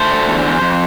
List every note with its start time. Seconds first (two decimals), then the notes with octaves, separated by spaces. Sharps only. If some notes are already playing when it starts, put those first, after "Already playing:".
Already playing: A3 C5
0.11 D3
0.28 E2
0.45 E2
0.61 F2